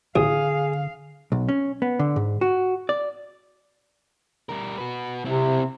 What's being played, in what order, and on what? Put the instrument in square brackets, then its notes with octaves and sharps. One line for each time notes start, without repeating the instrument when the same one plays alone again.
[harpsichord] A1 [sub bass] D3 [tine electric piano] G#4 G#5 D#6 [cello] F5
[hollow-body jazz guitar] B1
C#4
B3
D3
G#2
F#4
D5
[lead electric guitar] G3 A#4
F#4 B4
[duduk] C3 [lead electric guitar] C4 E4